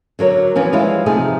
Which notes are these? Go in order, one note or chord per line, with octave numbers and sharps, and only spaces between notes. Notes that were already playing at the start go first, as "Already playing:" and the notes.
D3 F#3 A#4 C#5
E2 E3 F3 C#4
E3 F3 G3 G#3 E4 F4
C3 F3 A3 D#4 G#4